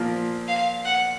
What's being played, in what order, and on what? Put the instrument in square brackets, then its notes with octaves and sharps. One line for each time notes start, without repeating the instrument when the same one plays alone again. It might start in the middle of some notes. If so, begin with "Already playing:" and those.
Already playing: [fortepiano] A#2 F3 A#3 F4
[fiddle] F5
F#5